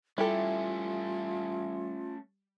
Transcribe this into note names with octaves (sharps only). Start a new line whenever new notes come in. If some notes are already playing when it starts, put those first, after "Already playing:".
G3 A3 C#4 E4 F4 G4 A4